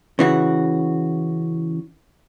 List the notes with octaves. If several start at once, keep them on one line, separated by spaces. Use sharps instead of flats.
C#3 E3 F#4